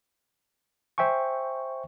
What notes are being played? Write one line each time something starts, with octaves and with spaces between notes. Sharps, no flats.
C5 E5 G5 G#5 C#6